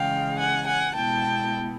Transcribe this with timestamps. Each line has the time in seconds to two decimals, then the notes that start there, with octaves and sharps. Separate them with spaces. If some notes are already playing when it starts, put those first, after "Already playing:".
Already playing: C#3 E3 G#3 F5 G5
0.38 F#5 G#5
0.67 F#5 G#5
0.94 B2 G#3 B3 E4 G5 A5